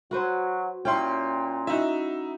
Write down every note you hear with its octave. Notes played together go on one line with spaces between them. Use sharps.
F#3 F#4 B4 C5
A#2 C#4 E4 G5 C6
D#4 E4 F#4 E5